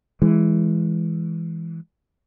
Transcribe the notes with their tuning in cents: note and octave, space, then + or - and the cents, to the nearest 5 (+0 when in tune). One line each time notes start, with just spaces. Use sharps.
E3 +0 G#3 +0